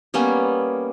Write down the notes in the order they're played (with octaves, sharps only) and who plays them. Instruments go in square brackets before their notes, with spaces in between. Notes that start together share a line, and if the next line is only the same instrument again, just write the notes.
[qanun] G3 A#3 B3 C#4